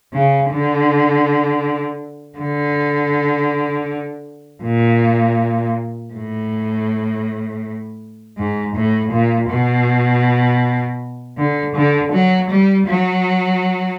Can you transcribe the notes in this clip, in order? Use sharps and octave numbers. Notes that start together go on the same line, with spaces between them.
C#3
D3
D3
A#2
A2
G#2
A2
A#2
B2
D3
D3
F#3
G3
F#3